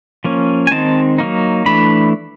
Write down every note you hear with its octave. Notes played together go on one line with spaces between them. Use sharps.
F3 A#3 C#4
G#5
D#3 G#3 C4 D#4 A5
F#3 A#3 D#4
E3 A3 D4 B5